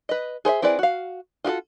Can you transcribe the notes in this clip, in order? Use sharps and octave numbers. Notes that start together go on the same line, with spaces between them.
B4 D#5
G#4 C5 C#5 E5
C4 E4 G#4 B4 D5
F#4 F5
F4 F#4 G#4 A4